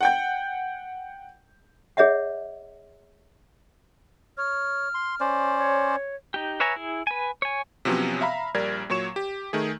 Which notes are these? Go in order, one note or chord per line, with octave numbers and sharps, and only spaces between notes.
F#5 G5 G6
G#4 C#5 D#5 E5 F#5
C#5 F6
C6
C#4 C5 D5
C#5
D#4 G4
B4 C#5 E5 G#5 A#5
E4 G#4
B4 G#5
C#5 G#5
C3 F3 F#3 B3 C#4
E5 F5 A#5 B5
A#1 G3 A#4 D5 G#6
A#2 F#3 C#5 C#6 E7
G4
D#3 A3 G#4